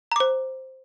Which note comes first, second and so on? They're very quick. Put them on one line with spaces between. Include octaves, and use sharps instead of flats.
A#5 D6 C5